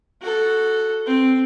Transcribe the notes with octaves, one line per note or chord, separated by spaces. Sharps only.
F#4 A4
C4